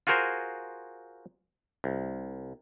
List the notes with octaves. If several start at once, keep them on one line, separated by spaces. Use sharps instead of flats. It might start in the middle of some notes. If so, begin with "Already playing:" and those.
F4 F#4 G#4 A#4 C5 G#5
C2